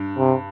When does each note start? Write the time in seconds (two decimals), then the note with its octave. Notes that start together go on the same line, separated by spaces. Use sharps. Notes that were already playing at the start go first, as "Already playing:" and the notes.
Already playing: G2
0.18 C3